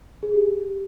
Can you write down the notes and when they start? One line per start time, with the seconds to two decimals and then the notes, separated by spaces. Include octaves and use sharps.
0.23 G#4
0.34 G4